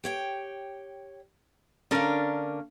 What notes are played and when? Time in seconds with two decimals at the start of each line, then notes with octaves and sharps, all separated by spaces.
0.04 G4 C#5 G5
1.91 D3 A#3 C#4 D4 A#4